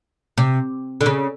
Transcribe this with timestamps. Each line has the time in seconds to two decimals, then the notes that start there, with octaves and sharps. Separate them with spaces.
0.38 C3
1.01 D3
1.06 C#3